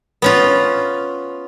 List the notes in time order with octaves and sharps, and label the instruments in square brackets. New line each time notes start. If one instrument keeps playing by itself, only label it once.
[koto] B3 C#4 F4